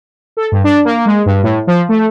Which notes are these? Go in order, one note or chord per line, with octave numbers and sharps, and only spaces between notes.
A4
G2
D4
A#3
G#3
G2
A2
F3
A3